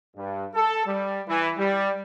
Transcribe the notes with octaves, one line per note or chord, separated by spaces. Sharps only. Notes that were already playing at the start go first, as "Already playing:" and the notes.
G2
A4
G3
E3
G3